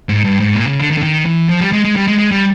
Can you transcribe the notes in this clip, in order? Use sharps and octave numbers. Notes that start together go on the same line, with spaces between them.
G#2
G2
G#2
A#2
C#3
D3
D#3
D3
D#3
E3
F3
G3
G#3
G#3
G3
G#3
G#3
G3